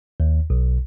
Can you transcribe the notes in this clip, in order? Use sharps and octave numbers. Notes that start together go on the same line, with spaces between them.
D#2
B1